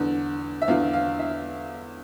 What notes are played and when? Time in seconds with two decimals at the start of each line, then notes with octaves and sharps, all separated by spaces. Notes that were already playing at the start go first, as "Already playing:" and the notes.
Already playing: E2 D3
0.62 E5
0.68 E2 D3 F5
0.93 F5
1.19 E5